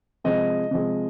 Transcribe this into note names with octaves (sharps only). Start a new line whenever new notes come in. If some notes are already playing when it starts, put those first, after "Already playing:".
C3 F3 G#3 D#5
C3 F3 G#3